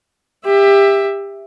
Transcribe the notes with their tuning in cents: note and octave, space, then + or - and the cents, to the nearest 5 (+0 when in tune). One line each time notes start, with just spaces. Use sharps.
G4 +25 E5 +5